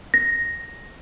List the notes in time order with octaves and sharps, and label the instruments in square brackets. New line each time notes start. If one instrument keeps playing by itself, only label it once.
[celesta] A#6